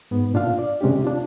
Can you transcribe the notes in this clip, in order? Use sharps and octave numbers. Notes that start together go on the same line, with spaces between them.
G#2 B3
A#2 D4 F4 F5
D5
C3 G#3 C#4 D4 G4
D4 F4